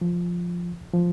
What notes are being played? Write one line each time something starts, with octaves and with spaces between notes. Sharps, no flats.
F3
F3